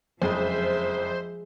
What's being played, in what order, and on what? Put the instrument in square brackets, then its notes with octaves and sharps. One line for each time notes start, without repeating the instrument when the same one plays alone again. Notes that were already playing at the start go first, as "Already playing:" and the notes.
[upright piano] F#1 F2 [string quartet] F3 E5 [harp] G#3 [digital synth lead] C5